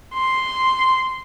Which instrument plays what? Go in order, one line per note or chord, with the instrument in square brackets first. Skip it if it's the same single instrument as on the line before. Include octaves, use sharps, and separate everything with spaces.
[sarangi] C6